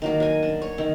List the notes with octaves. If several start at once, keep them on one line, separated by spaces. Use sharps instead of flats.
D#3 F#3 A#3
F#3 G#5
D4
C#5
D#3